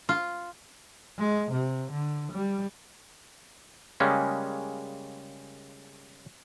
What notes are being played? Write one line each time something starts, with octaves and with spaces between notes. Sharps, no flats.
F4
G#3
C3
D3
G3
C#3 G3 G#3 A#3 C#4